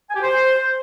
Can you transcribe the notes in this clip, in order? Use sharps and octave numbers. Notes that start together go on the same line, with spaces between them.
G#5
G4
C5